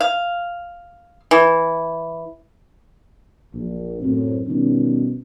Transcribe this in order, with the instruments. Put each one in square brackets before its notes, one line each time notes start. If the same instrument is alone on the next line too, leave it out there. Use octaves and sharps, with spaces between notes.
[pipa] F5
E3
[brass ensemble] A#1
F#2 A2 C4
B2 D#3 G3 C#4